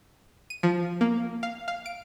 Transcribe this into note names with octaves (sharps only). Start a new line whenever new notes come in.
D#7
F3
A#3
F5
F5
D7